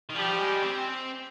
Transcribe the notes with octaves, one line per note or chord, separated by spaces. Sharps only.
D#3
F3 G3 G4
G#3
C4